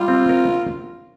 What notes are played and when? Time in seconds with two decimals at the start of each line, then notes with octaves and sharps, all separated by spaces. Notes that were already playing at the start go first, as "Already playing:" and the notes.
Already playing: G3 F4
0.08 C4
0.29 A#4